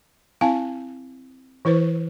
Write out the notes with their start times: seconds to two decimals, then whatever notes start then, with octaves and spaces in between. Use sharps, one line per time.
0.41 C4 E4 F5 G#5 A5
1.65 E3 E4 B4 C5